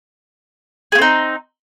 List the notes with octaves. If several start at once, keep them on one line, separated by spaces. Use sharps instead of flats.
A3 C4 D#4 G#4